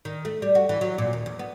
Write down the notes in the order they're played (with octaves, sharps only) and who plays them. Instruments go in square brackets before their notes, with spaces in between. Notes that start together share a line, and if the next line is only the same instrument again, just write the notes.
[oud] D#3
A3
G3
F#4
E3
F#3
A#2
D#2
E2
B3